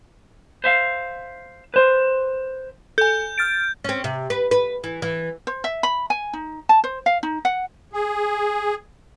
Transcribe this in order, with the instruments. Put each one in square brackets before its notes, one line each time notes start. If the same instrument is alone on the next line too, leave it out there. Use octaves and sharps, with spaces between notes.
[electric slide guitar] C5 E5 F5
B4 C5
[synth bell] A4 G#5 [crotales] G6
[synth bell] F6 A6 D7
[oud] C4 C#4
C3
B4
B4
E3
E3
[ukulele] C5
E5
B5
G#5
D#4
A5
C5
F5
D#4
F#5
[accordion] G#4